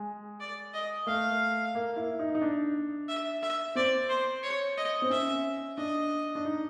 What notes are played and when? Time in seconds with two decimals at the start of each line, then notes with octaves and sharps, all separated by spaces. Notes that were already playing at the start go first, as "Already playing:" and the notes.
Already playing: G#3
0.40 D5
0.74 D#5
1.07 A3 F5
1.75 A#3
1.96 E4
2.19 D#4
2.35 D#4
2.42 D4
3.08 E5
3.43 E5
3.75 C4 D5
4.09 C5
4.43 C#5
4.77 D#5
5.02 C4
5.10 C#4 E5
5.78 D4 D#5
6.35 D4
6.45 D#4